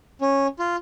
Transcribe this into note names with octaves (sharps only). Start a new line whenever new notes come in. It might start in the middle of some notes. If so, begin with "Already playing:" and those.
C#4
F4